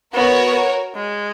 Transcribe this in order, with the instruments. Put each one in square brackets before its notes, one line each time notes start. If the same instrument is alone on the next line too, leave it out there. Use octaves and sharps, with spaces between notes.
[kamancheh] B3 [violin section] F#4 A#4 C#5
[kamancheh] G#3